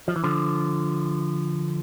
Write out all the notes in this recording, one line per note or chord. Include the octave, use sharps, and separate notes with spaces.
F3
E3
D3 F3